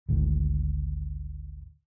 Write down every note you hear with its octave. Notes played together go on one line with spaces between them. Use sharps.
G#1 D2 G#2 D#3